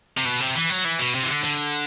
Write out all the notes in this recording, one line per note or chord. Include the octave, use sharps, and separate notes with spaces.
C3
B2
C3
E3
F#3
E3
B2
C3
E3
D3
D3